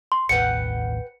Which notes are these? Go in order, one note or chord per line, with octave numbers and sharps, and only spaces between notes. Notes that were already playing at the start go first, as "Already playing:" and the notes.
C6
A1 D#2 A2 B4 F#5 G5 C#7